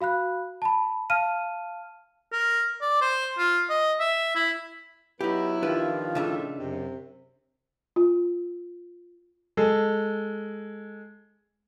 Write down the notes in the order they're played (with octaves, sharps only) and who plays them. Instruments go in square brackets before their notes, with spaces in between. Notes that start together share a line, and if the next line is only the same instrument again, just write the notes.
[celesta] F#4 F5 B5 F#6
A5 B5
F5 A5 F6 D#7
[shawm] A#4
D5
C5
F4
D#5
E5
E4
[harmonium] F#3 B3 B4 [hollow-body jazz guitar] D#4 G4 [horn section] E4
[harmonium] D#3 F3 F4 [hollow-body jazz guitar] D4 G4 B4
[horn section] A2 E5 [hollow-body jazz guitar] C#3 D4 D#4
[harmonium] F#2 [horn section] C3
[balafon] F4
[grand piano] G#3 A4